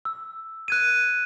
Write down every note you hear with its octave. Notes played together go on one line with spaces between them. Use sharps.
E6
F#6 G#6 D#7